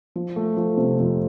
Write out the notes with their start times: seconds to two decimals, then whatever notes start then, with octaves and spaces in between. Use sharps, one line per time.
0.16 F3
0.36 A3
0.57 F3
0.78 C3
1.00 F2